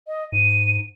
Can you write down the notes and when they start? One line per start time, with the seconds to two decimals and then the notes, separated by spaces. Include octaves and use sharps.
0.07 D#5
0.32 G#2 D#7